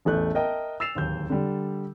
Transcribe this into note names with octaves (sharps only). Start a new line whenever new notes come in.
E1 A1 A3 F#6 G6
A#4 D#5 E5 G5 A5
E6 A6 C7 E7 F7
D1 D#2 G6
D3 G3